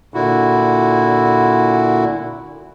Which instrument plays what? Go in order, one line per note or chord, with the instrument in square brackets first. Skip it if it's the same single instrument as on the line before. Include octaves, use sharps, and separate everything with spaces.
[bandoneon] A#2 D3 E4 F#4